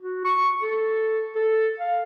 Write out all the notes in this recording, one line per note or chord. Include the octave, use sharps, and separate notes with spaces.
F#4
C#6
A4
A4
F5